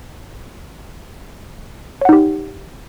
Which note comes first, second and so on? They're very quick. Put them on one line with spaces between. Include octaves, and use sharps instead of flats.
C#5 F#5 D#4 G4